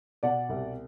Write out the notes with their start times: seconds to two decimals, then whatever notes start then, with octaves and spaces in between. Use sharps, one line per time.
0.23 B2 D5 F#5
0.49 C2